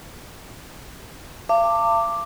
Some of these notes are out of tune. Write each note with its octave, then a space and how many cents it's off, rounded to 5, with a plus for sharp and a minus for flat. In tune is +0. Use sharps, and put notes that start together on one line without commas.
F5 -40 A5 +40 D6 +5